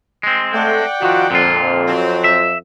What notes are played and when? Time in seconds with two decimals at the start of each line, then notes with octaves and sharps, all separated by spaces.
0.23 G#3 C4
0.53 A3 D5 F#5 G5
1.02 D#3 F3 F4 F#4
1.31 F2 A#2 D3 F4
1.87 F#3 C4
2.24 E5